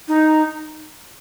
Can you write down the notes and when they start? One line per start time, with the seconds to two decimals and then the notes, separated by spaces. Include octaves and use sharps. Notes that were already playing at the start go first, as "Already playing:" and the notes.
0.08 D#4